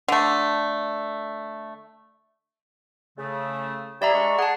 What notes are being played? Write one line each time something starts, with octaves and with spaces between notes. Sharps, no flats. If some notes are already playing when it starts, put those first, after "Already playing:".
D3 A3
C#3 A3
G3 E4 G#4 D5 E5 A#5
G#3 D4 C#6
G#4 F#5 A5